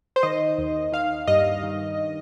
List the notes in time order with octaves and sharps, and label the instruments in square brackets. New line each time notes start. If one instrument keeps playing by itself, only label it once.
[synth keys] C5
D#3 D#5
D#2
D#3 F5
G2 D#5
D#3